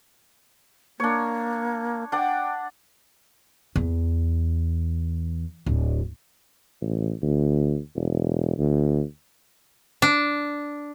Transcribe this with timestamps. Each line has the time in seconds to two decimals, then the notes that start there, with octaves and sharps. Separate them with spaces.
1.00 A#3 D4 C#5
2.12 D4 F#5 G5
3.76 E2
5.66 D1
6.81 A1
7.22 D2
7.95 E1
8.58 D2
10.02 D4